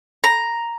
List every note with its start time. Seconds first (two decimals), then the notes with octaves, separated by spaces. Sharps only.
0.24 A#5